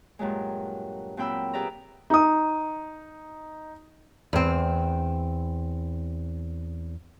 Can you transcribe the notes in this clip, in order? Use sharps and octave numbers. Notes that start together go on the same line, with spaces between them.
G2 A#2 F#3 G#3
A#2 F#3 C4 G5 B5 E6
G4 G#4 B4 D5 E5 A#5
D#4 D#6
E2 C4